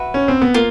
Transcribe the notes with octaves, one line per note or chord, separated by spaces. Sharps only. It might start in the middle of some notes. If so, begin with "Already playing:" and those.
Already playing: F#4 B4 E5
C#4
C4
B3
A#3 F4